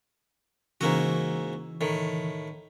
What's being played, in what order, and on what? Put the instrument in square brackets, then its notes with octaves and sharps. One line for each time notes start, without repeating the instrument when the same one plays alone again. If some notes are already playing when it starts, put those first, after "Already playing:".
[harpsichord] G#2 A#3 F#4 [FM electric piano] C#3 E3
[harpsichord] A2 D#3